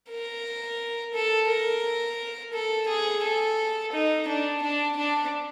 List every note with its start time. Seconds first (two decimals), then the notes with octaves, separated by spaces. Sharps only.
0.10 A#4
1.14 A4
1.49 A#4
2.53 A4
2.88 G#4
3.23 A4
3.92 D#4
4.27 D4
4.62 D4
4.96 D4